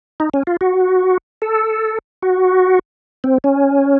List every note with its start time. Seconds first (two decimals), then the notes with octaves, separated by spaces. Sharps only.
0.20 D#4
0.34 C#4
0.47 F4
0.61 F#4
1.42 A4
2.22 F#4
3.24 C4
3.44 C#4